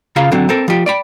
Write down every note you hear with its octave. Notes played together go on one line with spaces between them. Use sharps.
C#3 F4 G#4 F5 A#5 B5
D3 F#3 C4
C4 A4 A#4
F3 G4
D5 G5 B5